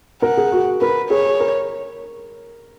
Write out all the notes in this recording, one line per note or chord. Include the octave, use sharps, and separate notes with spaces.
A#4 F#5
G#4
F#4
A#4 B4
G#4 C#5
A#4